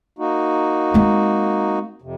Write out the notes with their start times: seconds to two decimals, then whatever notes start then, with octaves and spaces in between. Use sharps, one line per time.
0.19 A#3 D#4 F#4
0.94 G#3 C4
2.02 F2 C3